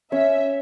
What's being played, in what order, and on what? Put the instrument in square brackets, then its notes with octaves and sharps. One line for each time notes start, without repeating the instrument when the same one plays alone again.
[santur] C#4 [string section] E5